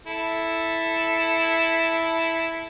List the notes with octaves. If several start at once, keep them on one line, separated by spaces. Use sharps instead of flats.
E4 A4